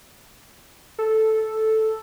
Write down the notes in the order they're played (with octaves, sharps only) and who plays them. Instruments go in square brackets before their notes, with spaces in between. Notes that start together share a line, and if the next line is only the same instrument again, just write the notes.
[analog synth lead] A4